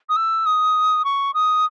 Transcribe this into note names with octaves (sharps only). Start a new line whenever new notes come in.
D#6
E6
D#6
C#6
D#6